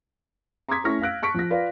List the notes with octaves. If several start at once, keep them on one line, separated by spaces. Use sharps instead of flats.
A#5 C6 D6 D#6 G#6 B6
A3 C#4 E4 C#6 F6 A#6
F5 E6 F#6 D7
A5 C#6 B6 D7
F3 A#6
F4 B4 D5 F5